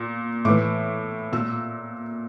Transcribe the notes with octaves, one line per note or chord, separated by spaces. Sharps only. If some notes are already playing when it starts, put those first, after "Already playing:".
Already playing: A#2
A2 E3 D6
A#2 E6